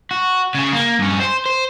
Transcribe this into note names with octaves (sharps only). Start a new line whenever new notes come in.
F#4
C#3 G#4
A#3
G2 C#4
C5
C5